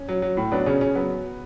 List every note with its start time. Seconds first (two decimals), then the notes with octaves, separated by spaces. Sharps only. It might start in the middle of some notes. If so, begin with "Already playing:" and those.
Already playing: C#4
0.09 F#3
0.22 F#3
0.37 A2
0.52 F#3 B3 D4
0.66 C#3 C#4
0.81 C#3 C#4
0.95 F#3 B3